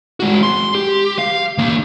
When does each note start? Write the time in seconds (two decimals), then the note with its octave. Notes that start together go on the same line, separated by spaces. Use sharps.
0.20 G#3 F#4
0.43 C6
0.75 G4
1.19 F5
1.58 E3 A#3